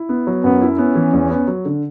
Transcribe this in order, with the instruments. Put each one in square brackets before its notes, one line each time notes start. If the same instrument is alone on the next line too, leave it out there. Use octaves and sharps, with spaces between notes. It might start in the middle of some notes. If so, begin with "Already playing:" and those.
Already playing: [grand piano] E4
B3
F#3
[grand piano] F#2 [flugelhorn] B3
[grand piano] E4
[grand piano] B3 [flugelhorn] C#4
[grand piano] E3
E2
B3
F#3
D3